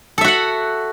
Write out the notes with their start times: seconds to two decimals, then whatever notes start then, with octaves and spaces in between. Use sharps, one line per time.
0.18 A4
0.21 E5
0.24 F#4
0.28 F#5